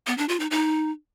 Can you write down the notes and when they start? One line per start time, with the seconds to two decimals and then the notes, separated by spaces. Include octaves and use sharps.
0.07 B3
0.18 D4
0.29 F4
0.40 D#4
0.51 D#4